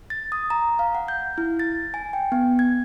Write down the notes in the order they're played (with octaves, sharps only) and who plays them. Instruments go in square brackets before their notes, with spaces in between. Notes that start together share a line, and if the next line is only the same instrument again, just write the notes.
[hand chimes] A6
D#6
A#5
F5
F#5
G6
E4
A6
G#5
G5
B3
G#6